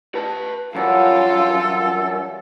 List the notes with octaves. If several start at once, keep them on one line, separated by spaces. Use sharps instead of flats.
B4 A5
F#2 E3 F#3 G3 F4 A4